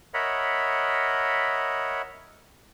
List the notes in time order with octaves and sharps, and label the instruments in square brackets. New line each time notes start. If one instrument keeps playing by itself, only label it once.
[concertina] A#4 C#5 D#5 E5 F#5 B5